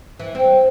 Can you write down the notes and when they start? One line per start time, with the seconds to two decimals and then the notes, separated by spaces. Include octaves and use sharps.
0.19 E3
0.35 C4